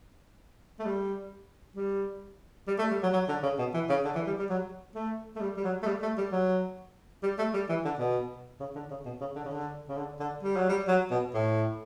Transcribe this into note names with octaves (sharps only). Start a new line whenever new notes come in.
A3
G3
G3
G3
A3
G3
F#3
F#3
D3
C#3
B2
E3
C#3
D3
E3
G3
G3
F#3
A3
A3
G3
G3
F#3
A3
G3
A3
G3
F#3
G3
A3
G3
E3
D3
B2
C#3
D3
C#3
B2
C#3
D3
C#3
D3
C#3
D3
D3
G3
F#3
G3
F#3
B2
A2